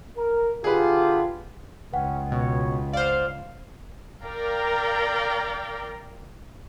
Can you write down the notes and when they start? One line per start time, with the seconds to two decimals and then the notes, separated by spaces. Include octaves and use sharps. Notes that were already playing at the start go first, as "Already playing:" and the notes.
0.17 A#4
0.64 D3 F4 G4 G#4 B4
1.93 C#2 C#4 B4 F#5 G5
2.32 B2 C#5
2.93 C5 D5 F5
4.24 A#4 D5 F5 G5 A#5